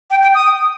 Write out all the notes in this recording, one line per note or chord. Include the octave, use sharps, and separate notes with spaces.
G5
G5
D#6